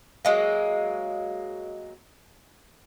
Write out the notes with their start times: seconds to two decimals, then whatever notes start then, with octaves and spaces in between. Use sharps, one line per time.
0.25 F#3 G#3 A#3